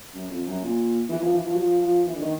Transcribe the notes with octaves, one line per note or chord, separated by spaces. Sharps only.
F#2
F2
F#2
A#2
E3
F3
E3
F3
F#3
F3
F3
E3
D3
D#3